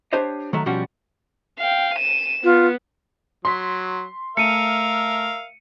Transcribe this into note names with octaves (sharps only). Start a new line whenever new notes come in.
D4 G4 C5 C#5 D#5
D#3 F#3 A3
B2 F3 G3 C#4 F#4
F5 G5
D#7 E7
B3 F4
F#3 C6 B6
A3 A#4 E5 F5 C#7 D#7